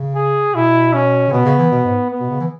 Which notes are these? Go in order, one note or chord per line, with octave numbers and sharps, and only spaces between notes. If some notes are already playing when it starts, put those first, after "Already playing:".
Already playing: C#3
G#4
B2 E4
C#4
C#3
B2 B3
C#3
E3
B2
G#2
B3
B2
C#3
E3